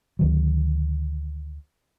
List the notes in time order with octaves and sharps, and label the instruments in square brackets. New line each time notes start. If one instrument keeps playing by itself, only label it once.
[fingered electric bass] D2 D#3 F#3